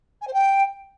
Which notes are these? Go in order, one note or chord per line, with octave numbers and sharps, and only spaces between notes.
G#5
C5
G5